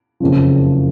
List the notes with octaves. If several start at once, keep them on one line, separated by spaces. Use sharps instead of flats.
F#1 F2 C#3 F3